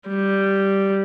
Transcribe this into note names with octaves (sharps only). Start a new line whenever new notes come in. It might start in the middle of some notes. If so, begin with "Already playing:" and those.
G3